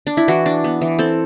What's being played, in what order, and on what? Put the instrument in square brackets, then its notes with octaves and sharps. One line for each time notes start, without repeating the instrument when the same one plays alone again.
[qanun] D4
E4
E3 F#4
D4
B3
E3
C4 A4